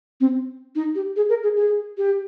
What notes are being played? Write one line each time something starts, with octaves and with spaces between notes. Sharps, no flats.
C4
D#4
G4
G#4
A#4
G#4
G#4
G4